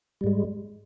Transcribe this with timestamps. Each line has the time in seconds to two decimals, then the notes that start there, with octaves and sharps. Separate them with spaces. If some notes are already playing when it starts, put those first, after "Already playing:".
0.21 G3
0.24 G#2
0.27 G#3